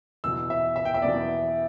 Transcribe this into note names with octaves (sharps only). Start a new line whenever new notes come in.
E2 B2 B3 E6
E5
E5
G5
E5
E2 B2 B3 D5